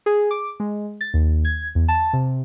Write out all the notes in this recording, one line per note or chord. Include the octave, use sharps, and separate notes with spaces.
G#4
D6
G#3
A6
D#2
G#6
E2
A5
C3